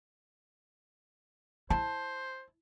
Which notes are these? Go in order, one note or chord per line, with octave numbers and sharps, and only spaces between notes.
E4 C5 A5